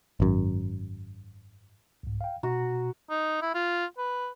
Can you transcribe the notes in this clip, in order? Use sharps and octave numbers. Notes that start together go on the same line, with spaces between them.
G#1 F#2
C2 G#2
F5 G5
B2 F#4 A#5
D#4
E4
F4
B4